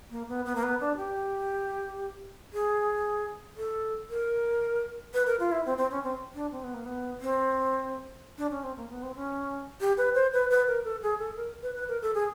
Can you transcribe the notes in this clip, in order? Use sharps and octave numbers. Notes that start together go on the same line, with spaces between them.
A#3
B3
B3
A#3
B3
D4
G4
G#4
A4
A#4
B4
A#4
F4
E4
C4
C4
C#4
C4
D4
C4
B3
A#3
B3
C4
D4
C#4
C4
A#3
B3
C4
C#4
G4
B4
C5
B4
B4
A#4
A4
G#4
A4
A#4
B4
B4
A#4
A4
G#4